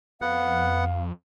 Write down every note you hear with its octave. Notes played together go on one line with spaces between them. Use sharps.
F2 B3 F5 F#5